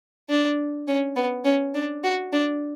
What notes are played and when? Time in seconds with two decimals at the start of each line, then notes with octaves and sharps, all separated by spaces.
0.29 D4
0.88 C#4
1.16 B3
1.45 C#4
1.74 D4
2.04 F#4
2.33 D4